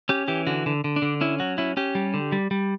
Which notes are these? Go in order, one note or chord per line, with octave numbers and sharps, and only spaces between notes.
C#4 G4
E3 G4
D3 F#4
D3
D3
D4
D3
C#4 E4
F#3 F#4
C#4 E4
C#4 G4
G3
D3
G3
G3